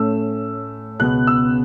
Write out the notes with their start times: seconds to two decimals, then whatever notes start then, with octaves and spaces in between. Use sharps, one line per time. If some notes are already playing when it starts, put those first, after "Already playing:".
Already playing: A2 A3 C#4 E6
1.00 C#2 B2 B3 F#6
1.27 E6